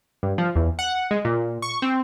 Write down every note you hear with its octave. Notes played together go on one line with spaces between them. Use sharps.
G2
F3
E2
F#5
G#3
A#2
C#6
C4